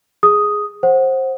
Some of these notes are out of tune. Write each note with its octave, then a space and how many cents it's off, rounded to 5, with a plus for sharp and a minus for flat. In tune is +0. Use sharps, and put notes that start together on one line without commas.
G#4 +0 D#6 +0
C5 +20 F#5 +0